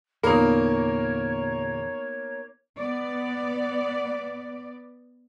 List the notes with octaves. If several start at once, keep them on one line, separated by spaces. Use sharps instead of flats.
E2 A#2 D3 A#3 B3 D#4 A#4 C#5
B3 D5